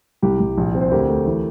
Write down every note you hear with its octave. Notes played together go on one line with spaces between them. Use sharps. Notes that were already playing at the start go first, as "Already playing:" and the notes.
C2 G4
C2
A#1
C4
C5
D2 G4 A#4
A3
E3